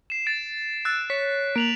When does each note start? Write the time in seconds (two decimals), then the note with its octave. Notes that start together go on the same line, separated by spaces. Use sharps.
0.10 C7 E7
0.26 A6 D7
0.85 E6 F#6 A6
1.10 C#5 B6
1.56 A#3 D7 F7 F#7